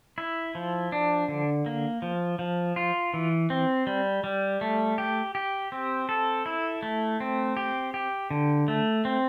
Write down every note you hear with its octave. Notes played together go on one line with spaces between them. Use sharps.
E4
F3
D4
D3
A#3
F3
F3
F4
E3
C4
G3
G3
A3
G4
G4
C4
A4
E4
A3
C4
G4
G4
D3
A3
C4